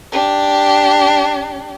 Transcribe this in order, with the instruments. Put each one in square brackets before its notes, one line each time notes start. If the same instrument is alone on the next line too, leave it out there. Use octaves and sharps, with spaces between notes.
[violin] D4 G4